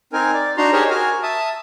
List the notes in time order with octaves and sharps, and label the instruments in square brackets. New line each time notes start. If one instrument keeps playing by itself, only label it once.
[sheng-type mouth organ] C4 D#4 A#4 G#5
D5
D4 D#4 F#4 A#5 C6
G4 G#4 A#4 C5 C#5 D#5
F#4 A#4 G#5
E5 A5 D#6